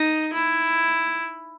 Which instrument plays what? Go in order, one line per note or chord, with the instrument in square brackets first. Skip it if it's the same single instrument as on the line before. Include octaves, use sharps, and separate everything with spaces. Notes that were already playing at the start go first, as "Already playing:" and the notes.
Already playing: [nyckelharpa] D#4
E4